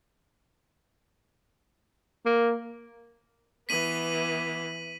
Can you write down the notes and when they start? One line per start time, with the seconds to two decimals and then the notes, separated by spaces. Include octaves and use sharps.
2.26 A#3
3.69 E3 B3 B6 D#7 F#7